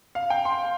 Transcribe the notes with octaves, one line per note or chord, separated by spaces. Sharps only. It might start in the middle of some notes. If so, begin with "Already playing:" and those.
F5
G5
C6